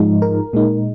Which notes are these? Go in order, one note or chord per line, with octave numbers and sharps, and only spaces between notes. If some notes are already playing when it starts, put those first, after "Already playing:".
Already playing: G#2 F3 G#3 D#4
A#4
A#2 G#3 D#4